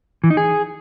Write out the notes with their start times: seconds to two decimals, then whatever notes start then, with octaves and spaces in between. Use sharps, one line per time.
0.24 E3
0.30 D#4
0.37 G#4